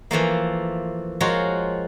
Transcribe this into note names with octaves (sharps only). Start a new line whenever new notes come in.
E3 F3 A3 A#3
F3 G#3 F4 F#4 A#4 C#5